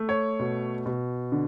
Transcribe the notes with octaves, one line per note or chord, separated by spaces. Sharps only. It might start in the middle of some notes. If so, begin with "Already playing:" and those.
Already playing: A3
C#5
B2
B2
D3